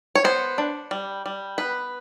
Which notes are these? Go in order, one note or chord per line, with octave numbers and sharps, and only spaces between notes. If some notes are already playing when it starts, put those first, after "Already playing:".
C#5
B3 C5
D4
G3
G3
B3 B4